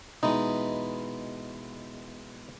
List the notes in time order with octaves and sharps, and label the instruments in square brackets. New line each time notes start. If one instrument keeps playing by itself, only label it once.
[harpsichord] B2 E3 G#3 [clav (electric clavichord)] D#4